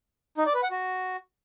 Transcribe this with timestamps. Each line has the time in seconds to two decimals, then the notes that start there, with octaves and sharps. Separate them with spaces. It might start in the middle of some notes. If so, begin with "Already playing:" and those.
0.38 D#4
0.46 D5
0.54 B4
0.63 F#5
0.71 F#4